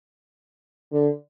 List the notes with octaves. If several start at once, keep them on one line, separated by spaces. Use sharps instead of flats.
D3